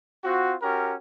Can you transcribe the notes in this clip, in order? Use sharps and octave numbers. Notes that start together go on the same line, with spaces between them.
C4 F4 F#4
C#4 F#4 G4 A#4